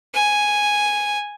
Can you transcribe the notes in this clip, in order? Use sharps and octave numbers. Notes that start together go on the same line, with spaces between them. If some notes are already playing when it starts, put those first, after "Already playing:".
G#5